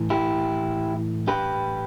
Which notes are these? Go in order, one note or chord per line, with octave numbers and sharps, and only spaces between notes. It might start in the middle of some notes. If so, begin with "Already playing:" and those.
Already playing: A2 E3
E4 G4
G4 B4